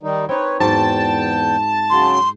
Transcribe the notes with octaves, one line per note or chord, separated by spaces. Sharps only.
D#3 G3 D#4
C4 D#4 B4 C#5
E2 G#2 F#3 G5 A5
C#3 F#3 C6